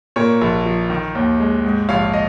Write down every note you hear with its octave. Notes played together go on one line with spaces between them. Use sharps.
A#2 A#4 C#5
A#1
F3
D#3
D#2
G#3
G#2
A#1 C#5 F5
D#5